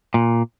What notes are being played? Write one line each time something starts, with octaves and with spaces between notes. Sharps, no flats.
A#2